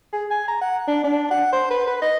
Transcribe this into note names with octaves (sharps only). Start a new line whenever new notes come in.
G#4
G#5
A#5
F#5
D4
D4
F#5
C5
B4
B4
D#5